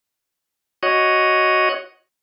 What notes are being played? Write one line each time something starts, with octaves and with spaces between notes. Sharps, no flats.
F#4 C#5 D#5